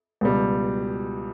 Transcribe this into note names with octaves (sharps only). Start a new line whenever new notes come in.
C#2 B2 G3